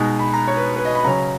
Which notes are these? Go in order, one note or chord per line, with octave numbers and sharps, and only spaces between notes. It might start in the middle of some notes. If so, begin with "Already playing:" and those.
Already playing: B2 G#3 D#4
B5
A#5
C#5
B4
B4
D#5
B5
C#3 F#3 C#4 A#5